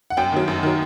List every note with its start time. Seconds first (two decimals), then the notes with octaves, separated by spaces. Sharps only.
0.10 F#5
0.17 F#2 G5
0.32 D#3 F#3
0.48 F#2
0.63 D#3 F#3